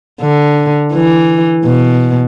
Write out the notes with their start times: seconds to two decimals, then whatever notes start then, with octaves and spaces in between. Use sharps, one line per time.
0.21 D3
0.93 E3
1.65 B2